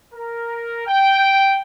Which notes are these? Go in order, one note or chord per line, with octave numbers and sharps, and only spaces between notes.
A#4
G5